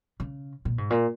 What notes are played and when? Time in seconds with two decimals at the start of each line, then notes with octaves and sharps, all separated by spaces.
0.20 C#3
0.65 A#2
0.78 G#2
0.90 A#2